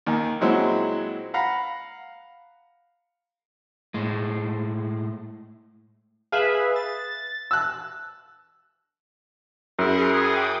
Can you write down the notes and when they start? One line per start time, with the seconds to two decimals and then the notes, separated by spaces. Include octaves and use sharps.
0.06 D#2 D#3
0.41 A#2 F#3 G#3 C4 E4 F#4
1.34 F5 F#5 A#5 B5
3.94 A2 G#3
6.32 G#4 B4 E5 F5
6.76 A6
7.51 E6 F#6
9.79 F#2 E4 G#4 A#4 C6
10.14 G#4 G5 D6 D#6